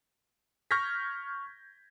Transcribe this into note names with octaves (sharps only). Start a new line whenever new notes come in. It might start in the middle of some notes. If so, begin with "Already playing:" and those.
C#6 F6 G6 G#6 A#6 B6